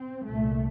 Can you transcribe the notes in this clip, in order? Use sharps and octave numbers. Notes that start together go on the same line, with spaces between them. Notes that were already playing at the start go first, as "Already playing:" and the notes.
Already playing: C4
C2 A#2 A3